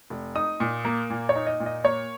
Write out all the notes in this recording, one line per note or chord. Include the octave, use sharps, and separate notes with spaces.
F1
D#4 D#6
A#2
A#3
A#2
C#5
D#4
D#5
A#2
D#5
A#3 C#5